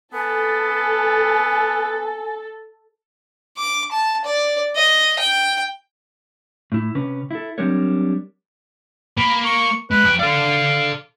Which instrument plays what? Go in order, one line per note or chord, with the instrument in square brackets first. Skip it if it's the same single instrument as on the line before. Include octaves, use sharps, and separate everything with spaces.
[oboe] B3 [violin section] A4 [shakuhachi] G#5
[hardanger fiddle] D6
A5
D5
D#5
G5
[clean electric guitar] A2 E4
C3 C#4 B4
E4 A4
F#3 G3 C4 D4 A#4 C#5
[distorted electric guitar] A#3 [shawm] B5
[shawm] C#6
[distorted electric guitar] G#3 [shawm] B4
[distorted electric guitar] F3 G5
[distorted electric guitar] A4 D5 [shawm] F5